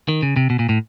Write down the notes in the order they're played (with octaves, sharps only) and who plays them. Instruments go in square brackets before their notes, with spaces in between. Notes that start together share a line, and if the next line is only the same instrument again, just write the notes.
[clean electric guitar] D#3
C#3
C3
B2
A#2
A2